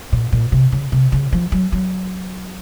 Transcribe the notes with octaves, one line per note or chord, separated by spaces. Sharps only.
A#2
A#2
C3
C#3
C3
C#3
F3
F#3
F#3